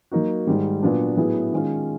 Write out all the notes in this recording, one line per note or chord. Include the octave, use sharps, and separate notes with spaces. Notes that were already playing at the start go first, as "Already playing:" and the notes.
F#3 A#3 D#4 F#4
G#2 D#3 G3
A#2 F#3 B3 D4
A2 F#3 B3 E4 G#4
D#3 G#3 C#4 F4